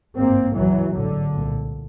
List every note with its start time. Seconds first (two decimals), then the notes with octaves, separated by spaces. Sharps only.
0.17 G#1 G2 A#3 C4
0.55 C#2 B2 E3 F#3
0.94 A1 G#2 D3
1.33 C2 A#2